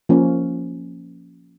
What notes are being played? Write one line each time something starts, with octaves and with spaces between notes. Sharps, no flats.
F3 A#3 C#4